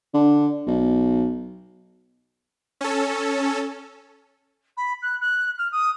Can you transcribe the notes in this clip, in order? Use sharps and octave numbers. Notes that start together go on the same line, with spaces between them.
D3
B1
C#4 A4
B5
F#6
F#6
F6
D#6